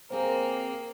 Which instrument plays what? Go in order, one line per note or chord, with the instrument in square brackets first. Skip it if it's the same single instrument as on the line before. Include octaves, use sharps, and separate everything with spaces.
[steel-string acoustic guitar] F2 C4 G#4 [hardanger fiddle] A#3 [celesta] C5